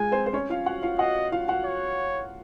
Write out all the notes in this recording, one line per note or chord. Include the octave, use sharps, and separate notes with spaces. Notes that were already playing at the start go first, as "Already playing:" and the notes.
Already playing: G#3 F4 G#4 G#5
C4 C5
C5
C#4 C#5
F4 F5
F#4 F#5
F4 F5
F#4 D#5 F#5
F4 F5
F#4 F#5
C#5